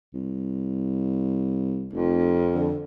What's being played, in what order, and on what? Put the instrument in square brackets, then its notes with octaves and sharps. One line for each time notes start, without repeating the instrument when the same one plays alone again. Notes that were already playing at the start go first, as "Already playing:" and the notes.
[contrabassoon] C2
[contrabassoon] F1 [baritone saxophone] F2
[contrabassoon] D3